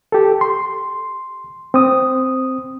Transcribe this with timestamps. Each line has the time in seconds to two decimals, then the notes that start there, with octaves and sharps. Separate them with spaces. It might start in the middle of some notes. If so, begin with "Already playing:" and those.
0.12 G4 A4
0.41 C6
1.74 C4 D#6